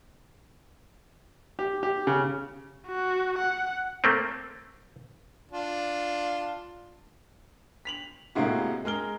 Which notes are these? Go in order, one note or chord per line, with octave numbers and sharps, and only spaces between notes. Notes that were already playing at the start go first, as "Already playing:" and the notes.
G4
G4
C#3
F#4
F#5
A3 A#3 C4
D4 F4
B6 F7 F#7
A2 C3 G#3 A#3 E4 F#4
G#3 A#4 F6 G7